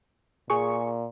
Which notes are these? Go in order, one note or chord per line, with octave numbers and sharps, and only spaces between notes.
A#2 G#4 C#6